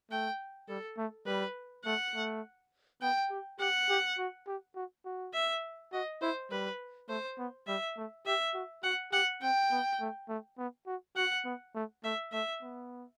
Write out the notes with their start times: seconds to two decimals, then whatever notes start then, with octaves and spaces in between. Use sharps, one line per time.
0.11 A3 G5
0.68 G3 A4
0.98 A3
1.26 G3 B4
1.85 A3 F#5
2.15 A3
3.01 B3 G5
3.30 G4
3.60 G4 F#5
3.89 G4
4.18 F#4
4.47 G4
4.76 F#4
5.05 F#4
5.34 E5
5.93 F#4 D#5
6.22 E4 C5
6.51 G3 B4
7.09 A3 C5
7.39 B3
7.67 G3 E5
7.97 A3
8.26 G4 E5
8.54 F#4
8.83 F#4 F#5
9.12 G4 F#5
9.42 C4 G5
9.71 B3
10.00 A3
10.29 A3
10.58 B3
10.87 F#4
11.16 F#4 F#5
11.45 B3
11.75 A3
12.04 A3 E5
12.32 A3 E5
12.62 B3